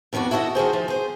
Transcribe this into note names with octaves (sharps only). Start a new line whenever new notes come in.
F2 D#3 B3 D4 F#4
E4 F#4 A4 C#5 D#5
D#3 F#4 G#4 C5
F3
G#4 C5